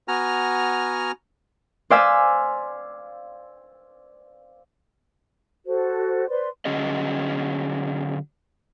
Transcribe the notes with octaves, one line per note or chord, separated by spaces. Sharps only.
B3 F#4 G#5 A#5 F6
C5 D5 F5 G#5 E6 B6
F#4 A4 C5
B4 C5 D5 C6
D3 F#3 C#4 G#4 D#5